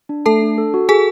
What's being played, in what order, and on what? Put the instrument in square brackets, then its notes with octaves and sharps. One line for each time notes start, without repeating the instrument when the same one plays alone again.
[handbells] D4
[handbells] A3 [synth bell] A4 A5
[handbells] D4
A4
F#4
[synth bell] G#4 G#5 [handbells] A4